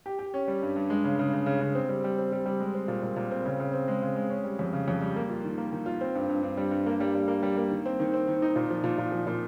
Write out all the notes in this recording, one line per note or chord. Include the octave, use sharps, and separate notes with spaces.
G4
G4
C#4
G3
G2
G2
G#3
C#3
C#3
C#3
C#3
C#3
C4
G3
G3
C4
G3
G3
G#3
C4
A#2
A#2
A#2
C4
C#3
C#3
C4
G#3
C#3
G#3
C#4
G3
F2
C#3
F2
G3
A#3
F4
D#3
A#3
D#3
F4
C4
G2
G2
G2
G3
G2
A#3
G3
G3
A#3
G3
A#3
D#3
C4
D#3
C4
D#3
D#4
A#2
F3
A#2
A#2
F3
A#2